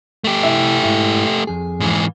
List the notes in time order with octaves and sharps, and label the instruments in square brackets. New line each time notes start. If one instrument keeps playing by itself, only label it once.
[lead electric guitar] A3 G4
[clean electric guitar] C2 E4 E5
G#2 E4
F2 G#4
[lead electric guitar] G#2 E3